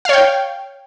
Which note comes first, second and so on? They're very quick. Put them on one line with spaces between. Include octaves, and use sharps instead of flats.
F5 C#5 G5